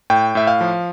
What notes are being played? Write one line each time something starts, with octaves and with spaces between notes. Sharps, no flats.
A2 G5
A2 E5
F5
F3